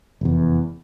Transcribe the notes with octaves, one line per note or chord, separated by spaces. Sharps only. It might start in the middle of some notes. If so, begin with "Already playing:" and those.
F1 E2